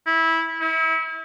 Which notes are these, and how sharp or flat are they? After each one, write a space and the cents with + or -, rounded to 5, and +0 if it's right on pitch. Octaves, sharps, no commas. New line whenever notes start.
E4 -15
E4 -30